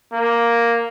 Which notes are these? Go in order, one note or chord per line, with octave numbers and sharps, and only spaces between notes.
A#3